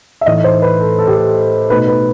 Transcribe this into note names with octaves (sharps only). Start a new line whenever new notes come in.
E5
A2 E3 A3 D#4 D#5
C5
B4
A4
A4
G4
A4
B2 A3 D#4 B4
B4